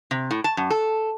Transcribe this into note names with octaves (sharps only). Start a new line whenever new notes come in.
C3
A2
A5
F#2
A4